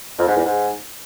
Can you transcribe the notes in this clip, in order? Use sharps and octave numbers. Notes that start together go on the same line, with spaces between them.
F2
G#2
E2
G#2